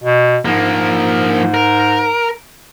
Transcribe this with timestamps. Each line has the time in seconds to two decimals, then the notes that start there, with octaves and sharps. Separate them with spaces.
0.03 B2
0.45 G#2 F3 A#3
1.54 A#4